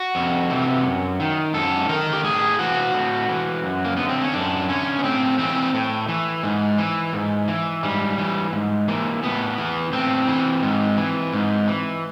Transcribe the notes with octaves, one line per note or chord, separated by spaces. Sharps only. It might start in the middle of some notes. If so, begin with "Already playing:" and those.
Already playing: F#4
F2
C3 E3
F#2
D#3
F#2 A4
D#3 A#4
G4
A2 G#4
E3 F#4
A2
E3
F#2
A#3
D3 B3
C4
C#4
F#2 D4
D3 C#4
B3
A2 C4
E3 C4
A2
E3
G#2
E3
G#2
E3
G#2 G3
E3
G#2
E3 A#3
A2 B3
E3
A2 C4
E3
G#2
E3
G#2
E3